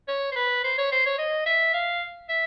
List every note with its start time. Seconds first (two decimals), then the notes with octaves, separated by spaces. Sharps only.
0.08 C#5
0.32 C5
0.36 B4
0.64 C5
0.78 C#5
0.92 C5
1.06 C#5
1.18 D#5
1.46 E5
1.74 F5
2.29 E5